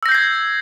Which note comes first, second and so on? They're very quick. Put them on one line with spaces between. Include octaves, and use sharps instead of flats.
E6 A#6 G6 C7 G#6